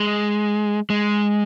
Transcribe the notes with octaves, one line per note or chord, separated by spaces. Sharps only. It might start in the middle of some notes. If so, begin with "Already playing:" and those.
Already playing: G#3
G#3